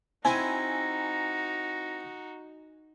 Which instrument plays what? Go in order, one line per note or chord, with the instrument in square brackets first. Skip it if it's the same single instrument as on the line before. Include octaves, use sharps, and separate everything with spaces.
[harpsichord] C4 E4 [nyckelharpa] D#4 F#4 [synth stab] G#5 [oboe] A#5